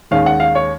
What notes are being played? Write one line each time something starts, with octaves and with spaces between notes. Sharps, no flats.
D#2 D#3 G#3 C#4 F5
F#5
F5
C#5